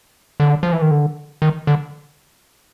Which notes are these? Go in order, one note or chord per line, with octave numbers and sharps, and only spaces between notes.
D3
F3
E3
D#3
D3
D#3
D3